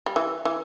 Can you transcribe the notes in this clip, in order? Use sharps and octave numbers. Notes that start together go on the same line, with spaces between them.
G3
E3
E3